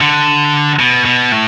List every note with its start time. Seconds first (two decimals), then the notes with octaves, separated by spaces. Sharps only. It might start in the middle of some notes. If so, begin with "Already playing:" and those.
0.01 D3
0.79 B2
1.05 B2
1.32 A2